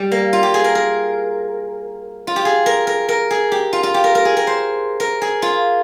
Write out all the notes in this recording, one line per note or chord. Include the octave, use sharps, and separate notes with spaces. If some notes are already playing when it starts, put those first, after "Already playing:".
Already playing: G3
A#3
F4
G4
G#4
A#4
A#4
F4
G4
G#4
A#4
A#4
A#4
G#4
G4
F4
F4
G4
A#4
A#4
G#4
A#4
C5
A#4
G#4
F4